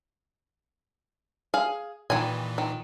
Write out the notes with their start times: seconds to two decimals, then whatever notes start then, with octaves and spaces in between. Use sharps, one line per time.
1.54 G#4 F5
2.10 A#2 D#3 E3 G3 G#5
2.58 D#3